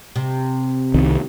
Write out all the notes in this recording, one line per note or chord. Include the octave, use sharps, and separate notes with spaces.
C3
C2 D#3